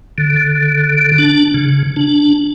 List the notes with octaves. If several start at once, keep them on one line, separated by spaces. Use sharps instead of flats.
D3
D4
C#3
D4